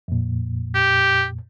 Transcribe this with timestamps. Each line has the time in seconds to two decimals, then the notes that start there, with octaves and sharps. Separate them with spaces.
0.08 F2 A#2
0.75 G4